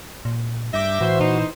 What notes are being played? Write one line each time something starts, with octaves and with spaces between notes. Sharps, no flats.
A#2
G2 E5 D6 G6 A#6
A2 E3 F#4 C5
A#2 D#4